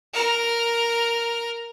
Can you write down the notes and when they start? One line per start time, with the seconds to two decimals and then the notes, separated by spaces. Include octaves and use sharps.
0.13 A#4 F6